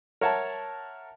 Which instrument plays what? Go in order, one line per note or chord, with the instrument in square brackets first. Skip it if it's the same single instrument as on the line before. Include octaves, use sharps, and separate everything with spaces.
[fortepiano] A#4 C#5 E5 F#5 A5